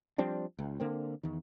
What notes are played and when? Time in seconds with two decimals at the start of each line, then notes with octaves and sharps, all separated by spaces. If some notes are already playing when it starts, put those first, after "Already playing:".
0.18 F3 G3 C4 D4
0.59 C#2
0.80 D3 A#3 C4
1.23 E2 D#3